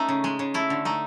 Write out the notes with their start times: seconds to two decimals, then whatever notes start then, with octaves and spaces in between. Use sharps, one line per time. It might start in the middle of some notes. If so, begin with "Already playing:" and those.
Already playing: A3 C#4 D#4
0.09 C#3
0.24 G#3
0.39 C#3
0.54 A3 E4
0.70 D3
0.85 A3 D#4